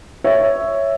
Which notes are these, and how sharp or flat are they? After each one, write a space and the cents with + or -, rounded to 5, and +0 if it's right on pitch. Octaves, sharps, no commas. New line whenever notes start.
C#5 +0 E5 +5